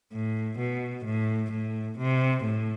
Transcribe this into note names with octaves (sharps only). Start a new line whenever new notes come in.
A2
B2
A2
A2
C3
A2